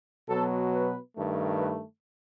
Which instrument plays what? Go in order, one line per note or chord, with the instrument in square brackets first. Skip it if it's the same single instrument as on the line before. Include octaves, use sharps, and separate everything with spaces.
[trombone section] B2 F#3 B3 A4
B4
G2 D#3 A3
B4